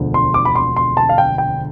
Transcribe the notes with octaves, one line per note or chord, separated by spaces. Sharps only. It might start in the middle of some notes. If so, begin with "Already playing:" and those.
Already playing: E1 D2 D3 F3 A3
C6
D6
B5
C6
C6
A5
F5
G5
G5